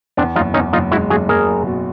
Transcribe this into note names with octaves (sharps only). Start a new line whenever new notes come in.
E2 C4 D4
F#1 D#4 F4
E2 C#4 D#4
F#1 D#4 F4
G#3 E4 F#4
F#1 F#4 G#4
F#1 G#4 A#4
F#1
B2